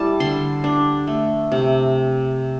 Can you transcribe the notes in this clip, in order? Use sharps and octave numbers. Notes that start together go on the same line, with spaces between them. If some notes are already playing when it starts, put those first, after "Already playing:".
Already playing: G3 E4 A5
D3 C6
D4
A3
C3